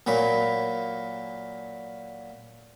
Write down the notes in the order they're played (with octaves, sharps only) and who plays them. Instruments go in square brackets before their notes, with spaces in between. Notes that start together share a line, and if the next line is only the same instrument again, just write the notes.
[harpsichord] A#2 F#3 A#3 B5